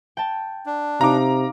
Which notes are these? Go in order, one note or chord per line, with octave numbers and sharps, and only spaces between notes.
G5 A5
D4
C3 D#4 F5 A#5 D6